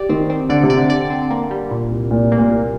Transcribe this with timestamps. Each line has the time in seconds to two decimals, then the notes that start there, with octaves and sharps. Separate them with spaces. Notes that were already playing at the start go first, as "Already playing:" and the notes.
Already playing: G4 D5
0.09 D#3 C4
0.30 C4
0.49 D3 D5
0.63 C3
0.70 D5
0.77 D3
0.90 D5
1.10 C4
1.30 A#3
1.51 G3
1.71 A#2
1.90 C2
2.10 C2 A#2
2.32 A#3
2.38 A#2
2.52 C2